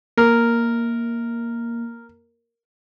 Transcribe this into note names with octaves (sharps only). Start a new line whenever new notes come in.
A#3 A#4